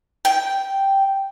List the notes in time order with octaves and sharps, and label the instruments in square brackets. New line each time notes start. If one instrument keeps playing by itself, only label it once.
[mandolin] G5